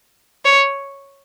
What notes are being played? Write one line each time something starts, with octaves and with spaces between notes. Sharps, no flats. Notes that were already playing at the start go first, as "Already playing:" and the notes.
C#5